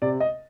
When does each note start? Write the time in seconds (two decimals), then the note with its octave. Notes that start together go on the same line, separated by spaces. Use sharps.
0.02 C3 D5
0.20 D#5